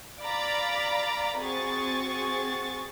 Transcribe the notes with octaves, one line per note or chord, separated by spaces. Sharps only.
D5 F5 A#5 B5 D6 A6
C4 F#4 G#4 C#6 A6